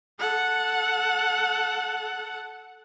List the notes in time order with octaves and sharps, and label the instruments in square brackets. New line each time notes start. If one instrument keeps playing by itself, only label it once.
[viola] A4 F#5